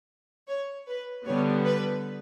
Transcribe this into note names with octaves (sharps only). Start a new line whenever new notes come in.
C#5
B4
D3 G3 B3 C#5
B4